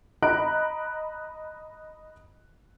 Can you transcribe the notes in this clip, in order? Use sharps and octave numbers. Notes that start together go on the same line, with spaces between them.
D#5 A#5 B5 F#6 D7